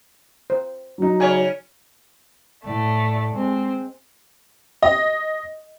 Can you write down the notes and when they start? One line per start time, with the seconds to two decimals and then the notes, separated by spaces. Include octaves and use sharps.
0.50 C5
0.98 F#3 D#4
1.20 C#3 C#5 D5 G#5
2.65 A2 A3 D5
3.35 G#3 C4
4.82 D#5